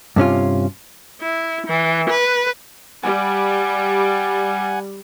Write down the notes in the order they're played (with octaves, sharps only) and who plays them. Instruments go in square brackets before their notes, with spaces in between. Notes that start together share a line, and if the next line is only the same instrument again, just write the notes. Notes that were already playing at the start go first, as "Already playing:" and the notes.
[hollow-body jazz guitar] G2 C3 C#4 F4
[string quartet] E4
E3
B4
[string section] G3 [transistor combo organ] F#5 G#5